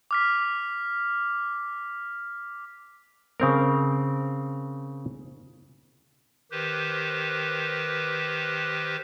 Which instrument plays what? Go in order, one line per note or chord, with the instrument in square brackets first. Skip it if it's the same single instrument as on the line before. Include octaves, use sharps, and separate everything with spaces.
[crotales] D6 F6 B6
[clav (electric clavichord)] C#3 C4 A#4
[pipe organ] D#3 G4 B4 C5